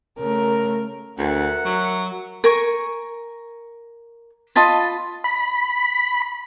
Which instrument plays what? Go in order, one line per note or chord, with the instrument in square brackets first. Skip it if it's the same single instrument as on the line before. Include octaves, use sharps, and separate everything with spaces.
[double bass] C#3 A3 [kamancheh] A#4
[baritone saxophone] D2 [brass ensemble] A#4 E5 F#5
[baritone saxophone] F#3
[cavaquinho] A#4 G#5 C#6
F4 D#5 A5 B5
[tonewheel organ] B5